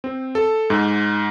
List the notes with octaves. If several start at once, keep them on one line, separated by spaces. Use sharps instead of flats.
C4
A4
G#2